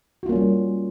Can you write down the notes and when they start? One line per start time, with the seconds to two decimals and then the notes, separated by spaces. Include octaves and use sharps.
0.23 F#4
0.26 F4
0.29 A#3
0.32 C#4
0.35 G3